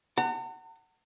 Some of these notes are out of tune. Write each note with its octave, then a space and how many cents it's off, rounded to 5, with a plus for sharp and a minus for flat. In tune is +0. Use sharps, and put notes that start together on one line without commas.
F#5 +15 A#5 -45